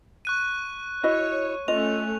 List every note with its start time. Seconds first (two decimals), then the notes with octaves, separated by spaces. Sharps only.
0.25 C#6 F#6 D#7
1.03 E4 F#4 C#5 D#5
1.68 A3 C#4 F4 D#5 F7